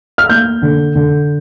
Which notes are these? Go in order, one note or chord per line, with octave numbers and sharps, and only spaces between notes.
F6
A#3 G6
D3
D3